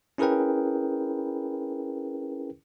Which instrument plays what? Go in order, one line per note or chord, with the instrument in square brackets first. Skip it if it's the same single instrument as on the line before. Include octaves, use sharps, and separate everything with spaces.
[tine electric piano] C#4 E4 G#4 A#4 B4 G5